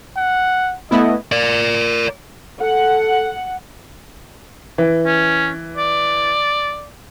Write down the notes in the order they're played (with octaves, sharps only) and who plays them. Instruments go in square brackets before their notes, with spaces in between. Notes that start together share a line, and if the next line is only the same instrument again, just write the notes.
[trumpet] F#5
[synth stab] A3 B3 E4 [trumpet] D#5
[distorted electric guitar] A#4 D5
[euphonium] A4 [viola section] F#5
[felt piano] E3
[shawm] C#4
D5